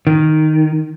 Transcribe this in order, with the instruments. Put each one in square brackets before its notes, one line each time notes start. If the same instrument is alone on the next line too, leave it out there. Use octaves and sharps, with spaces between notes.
[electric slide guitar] D#3